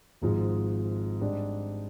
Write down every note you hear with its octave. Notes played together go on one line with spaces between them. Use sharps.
G#1 G#2 F3 G#3
G#2 G3 D4 G4